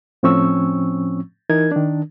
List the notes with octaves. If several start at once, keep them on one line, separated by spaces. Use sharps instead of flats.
A2 F3 C4 C#4 C#6 E6
E3 D#4 A#4 G#6
D#3 D4